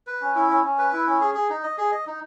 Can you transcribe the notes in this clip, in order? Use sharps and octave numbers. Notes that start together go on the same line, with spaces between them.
B4
C#4
E4
C#4
C#4
B4
E4
C#4
G#4
G#4
D#4
D#5
G#4
D#5
D#4